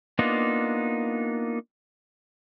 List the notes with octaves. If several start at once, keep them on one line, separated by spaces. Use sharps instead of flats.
A#3 B3 D4 D#4 F4